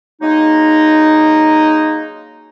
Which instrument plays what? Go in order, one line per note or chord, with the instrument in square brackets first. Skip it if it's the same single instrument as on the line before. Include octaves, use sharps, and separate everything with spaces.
[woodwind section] F#3 G#3 A#3 D#4